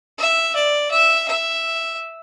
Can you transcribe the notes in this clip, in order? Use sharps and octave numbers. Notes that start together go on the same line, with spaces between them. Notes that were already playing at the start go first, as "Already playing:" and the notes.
E5
D5
E5
E5